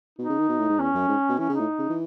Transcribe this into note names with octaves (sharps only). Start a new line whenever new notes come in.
B2 D#4
C#3
D#3
B2
A2
G#2
E2 C#4
F#2
G#2
B2
E3 C#4
C#3
D#4
A2
C#3
E3